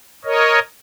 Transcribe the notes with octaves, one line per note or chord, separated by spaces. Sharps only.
A#4 C#5 D#5